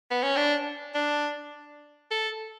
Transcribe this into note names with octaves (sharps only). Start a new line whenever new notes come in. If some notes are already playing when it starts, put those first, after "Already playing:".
B3
C#4
D4
D4
A4